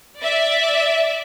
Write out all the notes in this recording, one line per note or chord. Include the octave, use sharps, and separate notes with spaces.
D5 E5